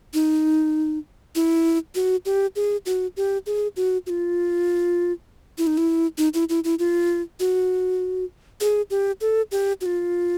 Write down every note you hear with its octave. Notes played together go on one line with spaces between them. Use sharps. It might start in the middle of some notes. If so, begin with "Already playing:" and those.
D#4
E4
F#4
G4
G#4
F#4
G4
G#4
F#4
F#4
F4
E4
D#4
E4
D#4
E4
E4
E4
F4
F#4
G#4
G4
A4
G4
F#4
F4